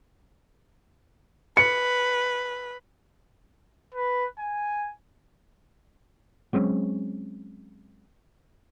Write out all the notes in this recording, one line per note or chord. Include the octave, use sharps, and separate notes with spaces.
B4 C#7
B4
G#5
F#3 G#3 C4 C#4